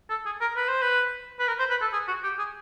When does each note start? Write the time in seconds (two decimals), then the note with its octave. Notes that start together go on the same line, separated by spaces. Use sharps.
0.10 A4
0.26 G#4
0.41 A#4
0.56 B4
0.69 C5
0.82 B4
1.39 B4
1.47 A#4
1.59 C5
1.70 B4
1.82 A4
1.93 G#4
2.08 F#4
2.24 G4
2.39 G#4